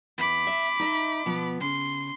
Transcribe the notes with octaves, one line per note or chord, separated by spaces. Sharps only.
E2 B5 D6
E5
D#4 D#5 E5
B2 F3 B3
C#3 C6